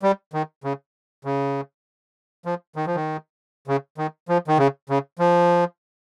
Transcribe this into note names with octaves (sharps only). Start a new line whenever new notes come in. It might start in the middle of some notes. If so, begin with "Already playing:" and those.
G3
D#3
C#3
C#3
F3
D#3
F3
D#3
C#3
D#3
F3
D#3
C#3
C#3
F3